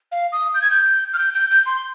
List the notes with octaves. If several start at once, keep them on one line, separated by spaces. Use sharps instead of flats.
F5
D#6
G6
G#6
G6
F6
G6
G6
G6
C6